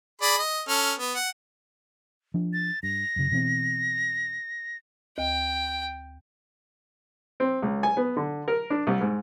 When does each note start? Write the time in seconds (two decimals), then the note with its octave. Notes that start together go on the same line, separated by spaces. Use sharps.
0.22 G#4 D5 B5
0.38 D#5
0.69 C#4 A4 F6
0.99 B3
1.15 F#5
2.34 F3 D4
2.53 A6
2.83 G2 A#6
3.16 F#2 C#3
3.31 B2 E3 C4
5.18 D2 G5
7.40 C4
7.62 C#2
7.83 G#5
7.97 B3
8.16 D3
8.48 A#4
8.70 D4
8.87 C2
9.01 G#2